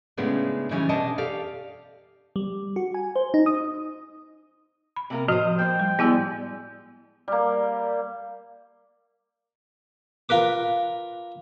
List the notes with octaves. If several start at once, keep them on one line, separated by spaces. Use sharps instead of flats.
A2 C#3 G#3 B3 D4
C#3 E3 G3 C#4 D#4 F4
B2 D4 D#5 A5
G4 A4 D5 F5
G3
F#4
G#5
C5
D#4
D#6
B5
C3 A#3 A#4
A2 F3 F#4 C5 D#5
A#3 C5 G5
G3
G3 G#3 B3 E4 E6
G3 A#3
F4 A#4 B4 D6